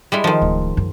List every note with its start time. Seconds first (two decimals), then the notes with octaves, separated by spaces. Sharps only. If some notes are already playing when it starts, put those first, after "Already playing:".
0.12 G3 G#3 E4
0.24 D#3 F3
0.42 D1
0.77 F#2